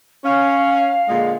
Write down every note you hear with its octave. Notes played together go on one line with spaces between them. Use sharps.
C#4 F5
A#2 D3 G#3